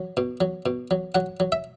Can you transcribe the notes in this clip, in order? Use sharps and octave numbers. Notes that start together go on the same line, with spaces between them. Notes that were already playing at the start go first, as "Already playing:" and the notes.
Already playing: F#3
B2
F#3
B2
F#3
F#3 F#5
F#3
E5